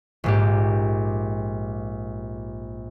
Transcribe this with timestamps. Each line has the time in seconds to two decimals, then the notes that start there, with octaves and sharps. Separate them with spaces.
0.24 A#1 G#2 G4